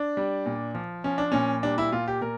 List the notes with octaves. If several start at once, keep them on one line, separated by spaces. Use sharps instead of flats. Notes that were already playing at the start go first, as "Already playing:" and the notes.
Already playing: D4
G3
A#2
F3
F3 C#4
D4
A#2 C#4
G3 D4
E4
A#2 F4
G4
A#2 A#4